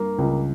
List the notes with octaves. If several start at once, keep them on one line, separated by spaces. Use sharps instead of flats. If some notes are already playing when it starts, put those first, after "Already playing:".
Already playing: G2 A#3
C#2